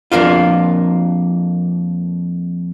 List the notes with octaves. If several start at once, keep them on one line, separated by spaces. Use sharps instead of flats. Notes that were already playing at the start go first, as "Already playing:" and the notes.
F2 G#2 A#3 D4 F4